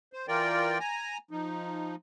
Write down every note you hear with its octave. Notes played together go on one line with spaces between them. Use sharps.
C5
E3 F4 A#4 D5 G5
G#5 A#5
F3 D#4